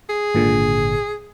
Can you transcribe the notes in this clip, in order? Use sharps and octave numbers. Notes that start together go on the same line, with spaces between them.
G#4
G#1 A#2 D3